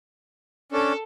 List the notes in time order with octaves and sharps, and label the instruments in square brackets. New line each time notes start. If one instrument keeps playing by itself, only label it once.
[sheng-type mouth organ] C#4 D4 [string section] A4